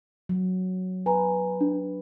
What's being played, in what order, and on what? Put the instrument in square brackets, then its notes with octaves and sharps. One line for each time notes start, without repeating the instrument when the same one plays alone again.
[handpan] F#3
[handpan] B4 [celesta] G#5 A#5
[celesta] D4